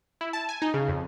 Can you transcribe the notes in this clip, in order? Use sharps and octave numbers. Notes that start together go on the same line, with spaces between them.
E4
A5
G#5
D#4
C#3
F2